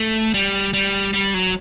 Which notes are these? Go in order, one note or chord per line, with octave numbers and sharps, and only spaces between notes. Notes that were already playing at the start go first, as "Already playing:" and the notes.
Already playing: A3
G3
G3
G3
F#3